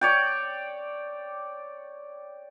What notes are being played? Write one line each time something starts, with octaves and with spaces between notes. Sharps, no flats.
C#5 D5 G5